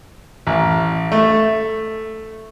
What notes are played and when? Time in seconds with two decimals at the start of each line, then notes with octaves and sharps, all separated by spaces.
0.47 A1
1.12 A3